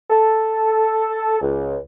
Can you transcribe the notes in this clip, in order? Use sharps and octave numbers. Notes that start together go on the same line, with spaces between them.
A4
C#2